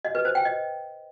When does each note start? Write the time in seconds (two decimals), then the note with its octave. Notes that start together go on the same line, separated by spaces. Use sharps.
0.05 D#5
0.15 B4
0.25 C5
0.35 G5
0.45 D#5